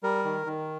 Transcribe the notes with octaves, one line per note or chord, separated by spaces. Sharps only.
G3 A#4
D#3
D#3